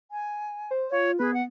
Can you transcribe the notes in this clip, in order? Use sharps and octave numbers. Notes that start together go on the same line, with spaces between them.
G#5
C5
F4 C#5
B3 G#4 B4
F#5